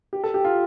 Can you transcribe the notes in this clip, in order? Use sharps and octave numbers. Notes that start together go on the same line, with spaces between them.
G4
A4
G4
F4